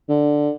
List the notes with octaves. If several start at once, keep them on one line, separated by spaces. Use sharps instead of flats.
D3